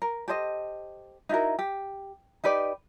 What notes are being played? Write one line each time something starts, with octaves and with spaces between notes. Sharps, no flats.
A#4
G4 A4 C5 D#5
D#4 E4 F#4 A#4
G4
D#4 G4 B4 D5